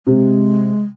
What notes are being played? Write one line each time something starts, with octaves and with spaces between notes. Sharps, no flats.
C3 G#3